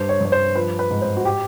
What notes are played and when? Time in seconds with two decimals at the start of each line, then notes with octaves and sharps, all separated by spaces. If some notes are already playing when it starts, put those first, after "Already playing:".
Already playing: G2 C5
0.09 C#5
0.21 G2 C#5
0.32 C5
0.56 F3 B4
0.79 B4
0.91 G#2
1.02 C5
1.17 F#4
1.25 G4